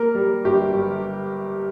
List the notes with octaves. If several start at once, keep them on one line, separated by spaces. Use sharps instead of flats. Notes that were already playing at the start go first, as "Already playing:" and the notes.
Already playing: A#3 A#4
G3
G1 G4
G1